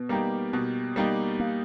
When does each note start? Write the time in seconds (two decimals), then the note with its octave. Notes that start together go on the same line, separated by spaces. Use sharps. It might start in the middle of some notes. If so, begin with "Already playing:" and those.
Already playing: B2 B3
0.09 G3 A#3 D#4 G4
0.53 B2
0.96 G3 A#3 D#4 G4
1.40 A#3